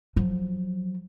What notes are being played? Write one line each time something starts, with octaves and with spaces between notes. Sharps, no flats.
F3 F#3